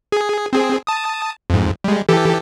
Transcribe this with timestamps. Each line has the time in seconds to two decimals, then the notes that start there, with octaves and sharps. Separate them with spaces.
0.12 G#4
0.53 C4 G#4
0.87 A5 D#6
1.50 F2 G#2
1.84 G3 G#3
2.09 E3 G4 A4